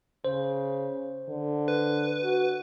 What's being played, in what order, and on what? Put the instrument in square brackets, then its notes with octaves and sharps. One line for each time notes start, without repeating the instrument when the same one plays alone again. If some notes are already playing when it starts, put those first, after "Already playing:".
[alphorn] C#3 [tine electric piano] C5
[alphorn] D3
[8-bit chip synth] B4
[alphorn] F#4